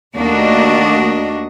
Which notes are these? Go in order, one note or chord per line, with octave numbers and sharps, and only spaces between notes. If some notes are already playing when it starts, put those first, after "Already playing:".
D#2 A3 A#3 D4 F#4 D#5